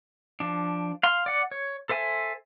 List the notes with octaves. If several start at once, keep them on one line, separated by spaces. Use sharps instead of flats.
F3 D4
F5 C6
D5 F#5
C#5
A4 C5 E5 G#5